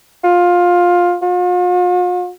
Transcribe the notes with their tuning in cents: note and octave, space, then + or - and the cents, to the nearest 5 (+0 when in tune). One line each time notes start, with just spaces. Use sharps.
F4 +15
F4 +45